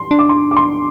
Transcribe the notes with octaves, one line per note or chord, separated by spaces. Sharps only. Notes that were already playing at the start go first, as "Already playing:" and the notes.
Already playing: C6
D4
D6
C6
D6
C6